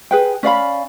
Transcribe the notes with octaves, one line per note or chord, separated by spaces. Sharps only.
G#4 B4 G5
C#4 D5 F5 B5